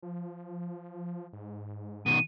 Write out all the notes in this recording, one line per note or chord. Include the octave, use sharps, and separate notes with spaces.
F3
G#2
B2 D#3 D#7